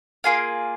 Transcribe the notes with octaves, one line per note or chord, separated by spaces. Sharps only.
A#3 F4 G#4 F5 G#5